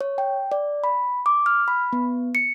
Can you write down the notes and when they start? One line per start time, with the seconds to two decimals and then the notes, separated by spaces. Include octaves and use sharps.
0.01 C#5
0.18 G5
0.52 D5
0.84 B5
1.26 D6
1.46 F6
1.68 B5
1.93 B3
2.35 C#7